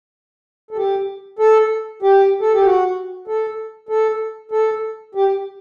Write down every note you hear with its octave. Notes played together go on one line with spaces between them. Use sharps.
A4
G4
A4
G4
A4
G4
F#4
A4
A4
A4
G4